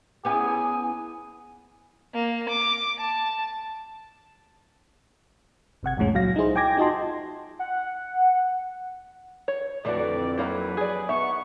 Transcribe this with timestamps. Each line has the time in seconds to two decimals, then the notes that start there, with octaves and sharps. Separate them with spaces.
0.25 B3 C#4 E4 G#4 G#5
2.14 A#3
2.49 D6
2.99 A5
5.83 G1 C3 F#5 G#6
5.97 C2 F2 A2 G#3 C#4
6.14 C#2 A#2 F#3 F5 A#6
6.36 D#4 E4 G#4 C5
6.56 G5 G#5 D6 G#6 A#6
6.77 D#4 F4 F#4 D#5 A5 C6
7.59 F#5
9.48 C#5
9.85 F2 D3 E3 A3 D4 F#4 D5
10.38 D#3 F#3 A#3 E4 B4
10.77 G#4 D5
11.09 B3 D#4 E5 C#6